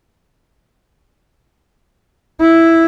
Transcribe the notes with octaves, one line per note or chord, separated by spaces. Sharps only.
E4